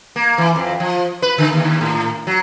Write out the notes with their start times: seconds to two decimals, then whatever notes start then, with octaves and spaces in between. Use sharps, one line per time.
0.16 A#3
0.38 E3
0.56 F2
0.80 F3
1.22 B4
1.38 D3
1.53 D#2
1.81 A2
2.27 F#3